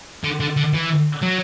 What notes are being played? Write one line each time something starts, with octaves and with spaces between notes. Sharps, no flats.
D3
D3
D3
E3
F#3